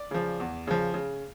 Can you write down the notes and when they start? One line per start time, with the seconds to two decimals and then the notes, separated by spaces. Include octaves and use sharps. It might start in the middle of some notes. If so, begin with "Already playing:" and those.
Already playing: D5
0.11 C#3 F3
0.40 E2
0.67 C#3 F3
0.94 C#3